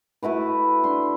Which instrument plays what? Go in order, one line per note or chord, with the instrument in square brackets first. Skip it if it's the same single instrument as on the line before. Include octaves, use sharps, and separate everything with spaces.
[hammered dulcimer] A3 E4 F#4 B4
D4 C6